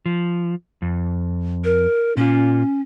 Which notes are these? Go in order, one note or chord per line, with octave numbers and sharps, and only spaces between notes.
F3
F2
A#4
A#2 C#4 F4